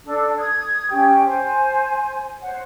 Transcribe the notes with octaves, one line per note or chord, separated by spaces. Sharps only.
D4 A4
D#6 G#6
C#4 G4 G5
C5 G#5
C5 C#5 F#5